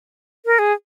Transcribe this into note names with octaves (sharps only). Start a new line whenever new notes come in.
A#4
G#4